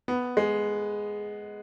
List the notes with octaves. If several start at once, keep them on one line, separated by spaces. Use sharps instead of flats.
B3
G#3